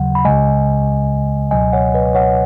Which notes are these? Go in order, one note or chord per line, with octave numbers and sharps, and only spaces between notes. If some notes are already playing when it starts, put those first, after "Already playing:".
Already playing: D#2 C#3 F#3 F#5
B5
C#2 C#3 G#3 D#5 G#5
C#2 B2 F#3 D#5 G#5
C#5 F#5
B4 D#5
C#5 F#5